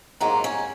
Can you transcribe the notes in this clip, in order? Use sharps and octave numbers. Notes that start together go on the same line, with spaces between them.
G#2 F#3 A#3 F4
C#4